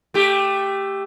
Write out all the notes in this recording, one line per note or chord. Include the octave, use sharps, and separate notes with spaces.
A3 G4